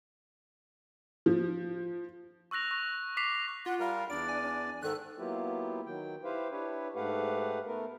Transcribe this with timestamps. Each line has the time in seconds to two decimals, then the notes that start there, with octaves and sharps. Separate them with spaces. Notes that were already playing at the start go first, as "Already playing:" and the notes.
1.26 F3
2.51 C#6 E6 F#6 A#6 F7
2.71 C#6
3.17 D6 B6 C7 F7
3.66 F4 F#5
3.80 G3 A#4 F5
4.10 E2 D4 D5 D7
4.29 G#5
4.42 D4
4.83 G#2 D#3 A4 F#6
5.18 F#3 A#3 B3 E4 F4 G4
5.86 D#3 F#3 G5
6.24 E4 G4 B4 C5 F5
6.51 D4 E4 G4 B4 C#5
6.95 G#2 A3 G4 B4 F5 F#5
7.67 A3 B3 A#4